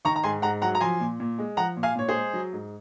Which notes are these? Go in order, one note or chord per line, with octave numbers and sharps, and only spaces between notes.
D#3 A#5 C#6
A#5
G#2 G#5 C6
G#2 F#5 A#5
F#3 F#5 A#5
A#5
F3 G#5 C6
A#2
A#2
G#3
F3 F#5 A#5
A#2
F5 G#5
A#2 C#5
G#4 C5
G#3
F#3
G#2